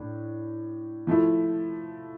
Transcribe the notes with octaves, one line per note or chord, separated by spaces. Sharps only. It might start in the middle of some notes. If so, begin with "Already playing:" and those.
Already playing: A2 D4
F3 A3 E4